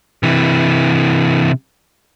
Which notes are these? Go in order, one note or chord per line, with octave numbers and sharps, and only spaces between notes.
C3 E3